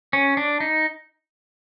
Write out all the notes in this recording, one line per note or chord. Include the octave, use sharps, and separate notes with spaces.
C#4
D4
D#4